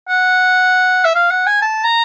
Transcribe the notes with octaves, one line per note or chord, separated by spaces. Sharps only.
F#5
E5
F5
F#5
G#5
A5
A#5